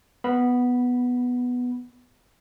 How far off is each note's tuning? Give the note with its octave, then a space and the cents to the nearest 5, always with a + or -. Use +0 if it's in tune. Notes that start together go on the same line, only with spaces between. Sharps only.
B3 +0 B5 -10